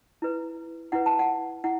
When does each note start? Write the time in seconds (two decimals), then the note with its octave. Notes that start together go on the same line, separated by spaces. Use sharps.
0.22 E4 B4
0.92 E4 B4 F#5
1.06 A5
1.19 F#5
1.64 E4 F#5